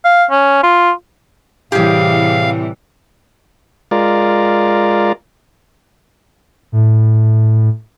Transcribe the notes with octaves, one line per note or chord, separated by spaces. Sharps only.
F5
C#4
F4
A2 C3 E3 G3 G4 G#4 F5
G#3 F4 A#4 D5
A2